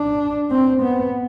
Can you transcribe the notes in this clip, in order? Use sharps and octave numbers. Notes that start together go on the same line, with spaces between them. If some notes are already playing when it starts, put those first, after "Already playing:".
Already playing: D4
C4
B3